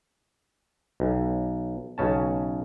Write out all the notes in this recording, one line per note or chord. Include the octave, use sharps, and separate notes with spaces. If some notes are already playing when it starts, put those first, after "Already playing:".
B1
B1 C#3 C#4 A5